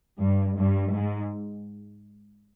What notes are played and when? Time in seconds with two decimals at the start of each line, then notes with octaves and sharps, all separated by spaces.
0.20 G2
0.57 G2
0.95 G#2